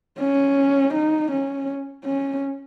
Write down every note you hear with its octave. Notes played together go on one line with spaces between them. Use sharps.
C#4
D#4
C#4
C#4